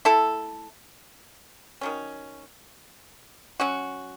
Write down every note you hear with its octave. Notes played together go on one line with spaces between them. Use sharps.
A3 E4 A4
D#3 F#3 C#4
F#3 C#4 F#4